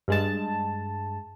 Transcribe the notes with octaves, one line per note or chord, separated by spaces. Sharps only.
G2 G#3 A5